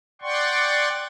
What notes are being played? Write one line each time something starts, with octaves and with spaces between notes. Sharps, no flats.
D5 F#5 G5 C6 C#6